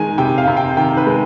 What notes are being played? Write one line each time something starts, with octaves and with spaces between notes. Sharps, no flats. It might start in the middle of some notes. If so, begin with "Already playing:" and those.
Already playing: D#3 G#3 G#5
C3 G5
F5
C3
G5
D#3 G5
B4
G#3